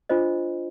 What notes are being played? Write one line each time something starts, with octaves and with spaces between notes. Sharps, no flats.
D4 F4 C5 D#5